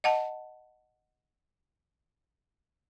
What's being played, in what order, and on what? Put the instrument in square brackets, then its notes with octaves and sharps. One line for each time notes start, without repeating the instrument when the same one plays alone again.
[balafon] D#5 F#5 A5